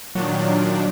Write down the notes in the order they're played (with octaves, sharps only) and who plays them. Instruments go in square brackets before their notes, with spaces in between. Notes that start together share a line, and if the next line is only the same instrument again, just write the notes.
[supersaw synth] A#2 D#3 D4 [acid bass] F#3